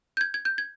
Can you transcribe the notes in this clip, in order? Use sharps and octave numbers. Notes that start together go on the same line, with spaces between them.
G6
G#6
G#6
G6
G#6